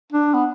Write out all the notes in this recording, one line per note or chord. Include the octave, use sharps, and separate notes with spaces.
D4
B3